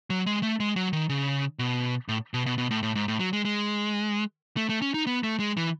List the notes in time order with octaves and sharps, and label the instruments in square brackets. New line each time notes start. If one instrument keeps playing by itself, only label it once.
[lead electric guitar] F#3
G#3
A3
G#3
F#3
D#3
C#3
B2
A2
B2
B2
B2
A2
A2
G#2
A2
F#3
G#3
G#3
A3
A3
C#4
D#4
B3
A3
G#3
E3